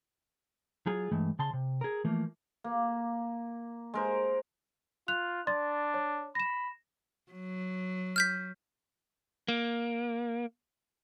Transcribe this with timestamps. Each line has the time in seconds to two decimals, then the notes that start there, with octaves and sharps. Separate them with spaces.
0.86 F#3 F4 G#4
1.11 G2 E3 G#3 A3
1.39 C#3 A5 C6
1.53 C3
1.81 G#4 A#4
2.05 E3 F3 A3 A#3
2.64 A#3
3.94 G#3 A#4 C5
5.08 F4 F#6 F7
5.47 D4 D5 C6 A6
5.94 C#5
6.35 B5 A#6 E7
7.32 F#3
8.16 F6 G6 B6
9.48 A#3